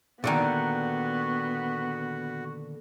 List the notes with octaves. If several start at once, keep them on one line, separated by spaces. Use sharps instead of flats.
A#2 D3 D#3 B3 F#4